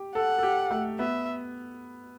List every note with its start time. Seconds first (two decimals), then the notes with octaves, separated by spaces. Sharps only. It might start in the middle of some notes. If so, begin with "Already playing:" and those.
Already playing: G4
0.15 A4 F#5
0.39 A4
0.43 G4
0.71 A3
0.99 B3 E5